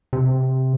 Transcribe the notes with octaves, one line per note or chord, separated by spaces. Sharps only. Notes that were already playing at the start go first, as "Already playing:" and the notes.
C3